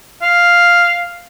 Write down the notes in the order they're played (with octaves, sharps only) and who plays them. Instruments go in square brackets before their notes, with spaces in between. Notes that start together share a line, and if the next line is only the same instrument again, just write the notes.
[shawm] F5